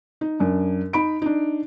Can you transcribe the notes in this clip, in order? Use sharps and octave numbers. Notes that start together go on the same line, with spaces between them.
D#4
F#2 D4
D#4 B5 D7
D4 D#4